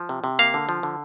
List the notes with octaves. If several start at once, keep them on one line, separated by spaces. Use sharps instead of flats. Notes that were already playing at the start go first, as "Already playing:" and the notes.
Already playing: F3
C3
C3
A#3 F5
D3
F3
D3